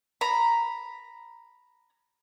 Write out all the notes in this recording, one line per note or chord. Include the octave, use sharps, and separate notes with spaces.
A#5 B5